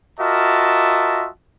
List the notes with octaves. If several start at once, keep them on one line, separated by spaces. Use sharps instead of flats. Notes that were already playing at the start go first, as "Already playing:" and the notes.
F4 F#4 A#4 D#5 E5 A5